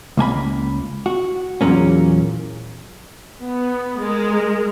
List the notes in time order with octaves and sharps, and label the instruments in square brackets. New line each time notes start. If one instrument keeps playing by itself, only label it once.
[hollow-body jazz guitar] C#2 A#3 G#5 B5
F#4
E2 A#2 F#3 A#3 C#4
[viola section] B3
G#3 A#4